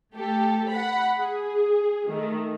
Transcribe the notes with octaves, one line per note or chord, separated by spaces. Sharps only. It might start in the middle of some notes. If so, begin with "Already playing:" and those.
A3 G4 A4
F#5 B5
G#4
D#3 A3